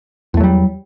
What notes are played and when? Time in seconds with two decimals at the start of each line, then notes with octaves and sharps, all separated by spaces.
0.34 E2
0.37 A3
0.40 F#3
0.44 G3